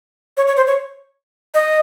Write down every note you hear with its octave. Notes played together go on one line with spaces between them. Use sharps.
C#5
C#5
C5
C#5
D#5